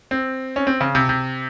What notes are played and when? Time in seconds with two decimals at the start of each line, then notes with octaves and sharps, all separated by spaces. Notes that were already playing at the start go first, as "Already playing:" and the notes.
0.11 C4
0.56 C#4
0.67 C4
0.81 C#3
0.95 C3
1.09 C3